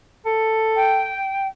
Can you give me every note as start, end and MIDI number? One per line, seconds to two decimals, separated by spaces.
0.26 1.15 69
0.76 1.47 79